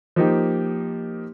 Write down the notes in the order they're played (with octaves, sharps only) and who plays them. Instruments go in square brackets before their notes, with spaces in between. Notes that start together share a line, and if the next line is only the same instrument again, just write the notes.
[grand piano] F3 A#3 D#4 G4